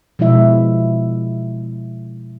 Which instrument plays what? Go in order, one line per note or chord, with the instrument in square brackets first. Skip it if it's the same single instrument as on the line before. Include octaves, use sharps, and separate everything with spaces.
[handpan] B2 F3 G#3 E4 E5